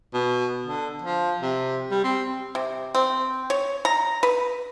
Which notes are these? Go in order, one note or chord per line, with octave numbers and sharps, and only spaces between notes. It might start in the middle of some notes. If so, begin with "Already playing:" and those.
B2
D3
F3
C3
G3
C4
C3
C4
C#5
A#5
B4